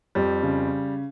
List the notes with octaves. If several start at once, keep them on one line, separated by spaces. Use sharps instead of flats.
F2 G3
C#3